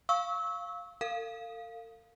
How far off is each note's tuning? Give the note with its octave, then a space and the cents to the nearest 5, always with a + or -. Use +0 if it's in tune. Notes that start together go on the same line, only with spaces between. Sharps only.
F5 +0 C#6 +0 E6 -25
A4 +45 F5 +0